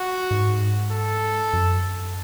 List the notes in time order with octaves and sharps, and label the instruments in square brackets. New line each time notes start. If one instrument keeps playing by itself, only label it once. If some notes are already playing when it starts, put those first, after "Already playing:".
Already playing: [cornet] F#4
[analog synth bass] G#2
[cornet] A4
[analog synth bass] F#2